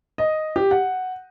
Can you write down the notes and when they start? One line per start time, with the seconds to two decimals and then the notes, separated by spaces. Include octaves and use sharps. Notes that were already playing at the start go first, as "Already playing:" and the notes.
0.18 D#5
0.56 G4
0.71 F#5